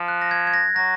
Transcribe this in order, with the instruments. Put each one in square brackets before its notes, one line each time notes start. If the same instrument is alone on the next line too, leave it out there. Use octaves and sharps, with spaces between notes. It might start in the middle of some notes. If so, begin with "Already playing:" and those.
Already playing: [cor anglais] F3
[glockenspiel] F#6
A#6
G#6
G#6
A#6
[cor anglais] F#3 [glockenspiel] A#6